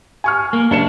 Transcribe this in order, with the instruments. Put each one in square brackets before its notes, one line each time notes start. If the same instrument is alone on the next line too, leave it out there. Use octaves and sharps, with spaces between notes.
[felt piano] G#5 C#6 F6
[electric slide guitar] A#3
[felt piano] F#1 C#7 E7 [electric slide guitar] D4